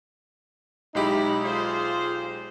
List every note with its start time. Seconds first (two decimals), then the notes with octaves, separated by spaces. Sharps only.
0.95 B1 G#3 D#4 E4 G4 B5
1.45 F4 G#4 C5